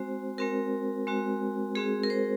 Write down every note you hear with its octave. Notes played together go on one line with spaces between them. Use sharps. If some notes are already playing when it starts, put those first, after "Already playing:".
Already playing: G#3 C4 F#4 C5
G#3 C4 F#4 A#4
G#3 C4 F#4
G#3 C4 F#4 G#4
A#4
C5